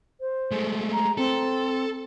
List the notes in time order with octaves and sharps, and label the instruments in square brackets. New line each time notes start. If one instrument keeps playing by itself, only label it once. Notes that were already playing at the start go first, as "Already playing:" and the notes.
[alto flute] C5
[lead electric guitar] G#3 A3
[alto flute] A#5
[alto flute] C4 [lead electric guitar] A4